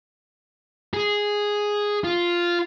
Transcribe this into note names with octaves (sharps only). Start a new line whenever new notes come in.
G#4
F4